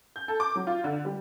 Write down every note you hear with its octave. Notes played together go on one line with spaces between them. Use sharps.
G6
A4
D6
F#3
F4
D3
G3